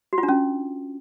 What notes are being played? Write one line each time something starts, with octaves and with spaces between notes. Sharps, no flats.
F#4
F4
D4
C#4